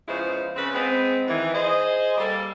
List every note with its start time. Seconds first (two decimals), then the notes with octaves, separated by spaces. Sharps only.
0.08 C#3 F3 G#3 B3 E4 C5
0.56 C#3 C4 B4
0.73 G#3 B3 C4
1.28 D#3 E3
1.54 G#4 C5 D#5
2.17 G3 A#3 A4